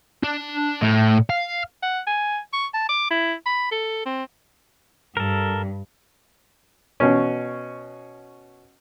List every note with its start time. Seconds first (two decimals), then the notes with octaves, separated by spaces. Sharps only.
0.23 D4
0.82 A2
1.30 F5
1.82 F#5
2.07 G#5
2.53 C#6
2.74 A5
2.89 D6
3.10 E4
3.46 B5
3.72 A4
4.06 C4
5.17 G2 A4 A#4
7.00 B2 C#4